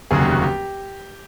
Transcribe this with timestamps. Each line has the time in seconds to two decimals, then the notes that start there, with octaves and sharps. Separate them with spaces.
0.11 F1 D#2 C#3 F#3 G#4
0.21 G4
0.32 F#4
0.42 G4